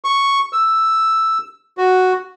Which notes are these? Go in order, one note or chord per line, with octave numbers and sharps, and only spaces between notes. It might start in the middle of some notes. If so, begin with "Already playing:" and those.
C#6
E6
F#4